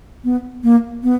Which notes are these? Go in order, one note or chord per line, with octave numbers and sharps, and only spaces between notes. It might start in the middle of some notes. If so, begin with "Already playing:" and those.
B3
A#3
B3